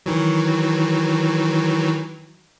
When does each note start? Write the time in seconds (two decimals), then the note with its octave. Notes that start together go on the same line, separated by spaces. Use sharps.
0.06 D#3 E3 F#3